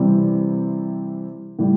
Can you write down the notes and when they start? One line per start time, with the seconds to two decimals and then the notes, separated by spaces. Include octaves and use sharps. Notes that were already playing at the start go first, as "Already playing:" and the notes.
Already playing: C3 E3 G3 C4
1.59 A2 G3